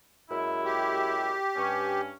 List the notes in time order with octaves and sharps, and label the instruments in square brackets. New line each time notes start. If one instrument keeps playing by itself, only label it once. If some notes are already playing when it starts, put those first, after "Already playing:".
[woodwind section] F#2 G#3 E4
[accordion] G4
[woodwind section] G2 C#4